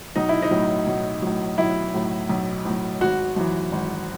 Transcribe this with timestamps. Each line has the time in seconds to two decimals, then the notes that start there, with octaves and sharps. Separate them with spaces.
0.16 B1 D#4
0.29 E4
0.42 D#4
0.51 A2 F#3
0.87 B1
1.22 A2 F#3
1.58 B1 E4
1.94 A2 F#3
2.29 B1
2.65 A2
2.70 F#3
3.01 G#1 F#4
3.36 F#2 E3
3.72 G#1